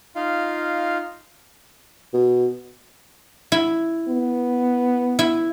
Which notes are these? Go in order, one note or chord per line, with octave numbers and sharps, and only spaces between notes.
D#4 F4 F5
B2
E4
B3
E4